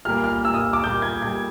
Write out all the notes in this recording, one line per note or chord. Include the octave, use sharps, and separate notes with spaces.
A#2 G3 A#3 F6
F6
A#2 G3 A#3 E6
D#6
D6
A#2 G3 A#3 G6
G#6
A#2 G3 A#3 G#6